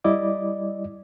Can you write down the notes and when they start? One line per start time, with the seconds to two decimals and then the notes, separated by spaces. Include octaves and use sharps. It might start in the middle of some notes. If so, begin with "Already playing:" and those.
0.04 G3 E4 D5 D#5 D6